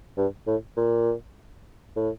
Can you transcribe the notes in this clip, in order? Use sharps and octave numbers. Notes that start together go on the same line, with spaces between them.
G2
A2
A#2
A2